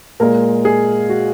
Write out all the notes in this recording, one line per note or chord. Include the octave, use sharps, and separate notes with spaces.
A#2 G#3 A#4
G#4
F#4